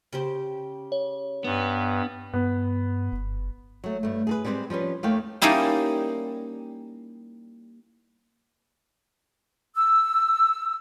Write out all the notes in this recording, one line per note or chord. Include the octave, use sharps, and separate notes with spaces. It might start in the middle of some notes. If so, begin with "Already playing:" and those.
C#3 G4 C5
C#5
G2 B3
G2 B3
F#1
F#3 A3
G2 A3
G#4 A4 B4
G3 G#3 C4 G4 B4
F3 G3 C#4 B4
D#2 D#3 A3 F5 G5
G3 A#3 C#4 D#4 E4 G4
E6